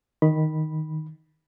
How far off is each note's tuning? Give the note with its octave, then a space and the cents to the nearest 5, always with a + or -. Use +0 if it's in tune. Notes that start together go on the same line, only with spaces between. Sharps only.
D#3 +0 B5 -10